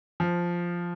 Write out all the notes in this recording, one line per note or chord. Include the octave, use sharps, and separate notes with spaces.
F3